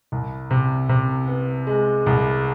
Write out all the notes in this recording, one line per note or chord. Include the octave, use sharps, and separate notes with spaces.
C2
C3
C3
B3
G#3
C2